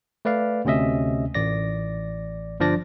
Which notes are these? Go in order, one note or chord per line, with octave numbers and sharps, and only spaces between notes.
A3 B4 D5 F5
D2 C3 C#4 D#5 E5
A1 D5 A#6
G1 F3 D4 D5 A#6